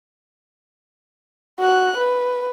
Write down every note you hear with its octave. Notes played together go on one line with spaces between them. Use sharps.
F#4 F#6
B4